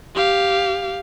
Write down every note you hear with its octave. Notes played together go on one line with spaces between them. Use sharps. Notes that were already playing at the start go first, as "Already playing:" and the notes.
G4 F5